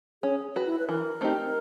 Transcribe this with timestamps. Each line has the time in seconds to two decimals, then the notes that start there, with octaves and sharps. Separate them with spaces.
0.22 C#4 G#4
0.56 F#4 B4
0.66 E4
0.79 B4
0.88 E3 A#4
1.21 A3 C4 D#4 G4